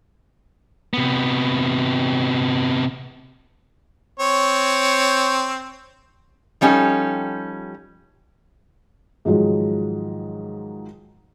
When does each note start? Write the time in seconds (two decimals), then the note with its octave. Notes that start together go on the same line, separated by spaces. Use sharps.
0.94 C3 B3
4.20 C4 C#5
6.61 F3 G3 C#4 D#4 G4 A4
9.25 G#2 D#3 F3 F#3 G#3